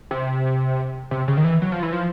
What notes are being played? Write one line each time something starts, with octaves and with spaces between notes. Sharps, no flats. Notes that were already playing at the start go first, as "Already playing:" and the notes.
C3
C3
C#3
D#3
E3
F#3
F3
E3
F3